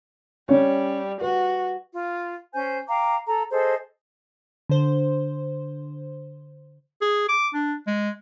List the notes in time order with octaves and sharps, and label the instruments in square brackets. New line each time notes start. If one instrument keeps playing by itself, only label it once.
[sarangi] G3 [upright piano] C#4 C#5
[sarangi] F#4 [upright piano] B4
[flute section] F4
C#4 C5 G#5 G6
F5 G5 A#5 D6
A4 A#5
G#4 A4 C5 D#5
[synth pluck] D3 C5
[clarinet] G#4
D6
D4
G#3